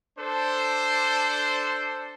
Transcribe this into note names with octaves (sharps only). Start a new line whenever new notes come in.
D4 A4 C5